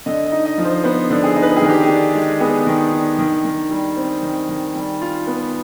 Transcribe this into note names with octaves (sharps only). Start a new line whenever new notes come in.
D3 D#5
D#5
D#4
D#5
F3
C5
B3 C5
D3
G#4
D#4
B4
G#4
D#3
G4
G#4
D4
G#3
B3 G#4
D#3
D4
D#3
D#3
G3
C4
D#3
D#3
G3
F4
B3